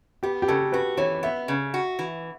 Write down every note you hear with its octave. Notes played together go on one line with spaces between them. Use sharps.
B3 G4
G4
C#3 A4
F#4 B4
E3 C#5
B3 E5
C#3
F#4
E3